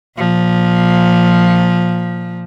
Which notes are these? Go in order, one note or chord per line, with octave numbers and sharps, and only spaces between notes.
A#2 F3